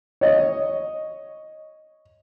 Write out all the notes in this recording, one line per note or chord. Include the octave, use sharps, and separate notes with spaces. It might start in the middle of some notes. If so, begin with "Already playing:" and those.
C#5 D#5